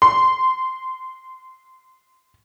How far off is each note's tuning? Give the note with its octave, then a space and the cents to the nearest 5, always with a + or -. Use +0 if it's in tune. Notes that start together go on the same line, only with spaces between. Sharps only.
C6 -20